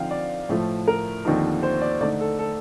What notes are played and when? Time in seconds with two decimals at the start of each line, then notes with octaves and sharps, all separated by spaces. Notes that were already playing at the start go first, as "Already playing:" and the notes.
Already playing: D3 F3 C4 D#4 F5 G5
0.11 D5
0.49 A2 F3 A3
0.88 A#4
1.25 D#2 D3 F3 C4 D#4
1.63 C5
1.81 D5
2.01 D3 A3 D#4 D5
2.20 A4
2.39 A4